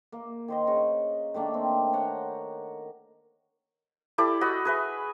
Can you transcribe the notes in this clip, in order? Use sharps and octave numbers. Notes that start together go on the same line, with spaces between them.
A#3
D#3 C5 D#5
C#3 D#5 C#6
D#3 A3 A#3 D4
C4
A#4 C#5 F#5 G5
E4 G4 A4 D5
F#4 D#5 B5
G#4 B4 E5